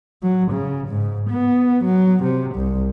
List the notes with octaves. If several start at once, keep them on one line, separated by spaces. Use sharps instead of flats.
F#3
C#3
G#2
B3
F#3
C3
C2